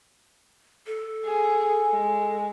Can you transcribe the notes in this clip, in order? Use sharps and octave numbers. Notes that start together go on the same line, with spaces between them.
A4
G#4
G#3